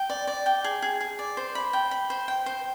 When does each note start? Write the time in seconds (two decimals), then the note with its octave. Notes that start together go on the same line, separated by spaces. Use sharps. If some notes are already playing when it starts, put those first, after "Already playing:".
Already playing: G5
0.10 D5
0.27 D5
0.46 G5
0.64 G#4
0.82 G#4
1.01 G#4
1.19 D5
1.37 C5
1.55 B5
1.73 G5
1.91 B5
2.10 C5
2.28 G5
2.46 C5